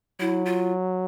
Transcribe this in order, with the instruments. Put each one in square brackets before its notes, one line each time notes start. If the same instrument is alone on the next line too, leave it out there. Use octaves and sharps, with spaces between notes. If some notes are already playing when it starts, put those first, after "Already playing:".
[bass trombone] F#3 [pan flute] E4
[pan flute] F4